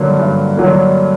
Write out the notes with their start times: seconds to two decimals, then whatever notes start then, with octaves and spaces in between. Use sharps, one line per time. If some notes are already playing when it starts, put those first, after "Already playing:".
Already playing: G2 D3 F#3 A#3
0.19 G2
0.57 D3 F#3 A#3